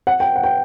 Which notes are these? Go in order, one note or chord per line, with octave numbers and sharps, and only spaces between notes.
F#5
G5
F#5
G5